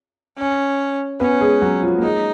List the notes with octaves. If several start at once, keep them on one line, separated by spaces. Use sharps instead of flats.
C#4
B3 C#4 B4
G#3 G#4
F#3 F#4
F3 F4
A#3
G#3 D#4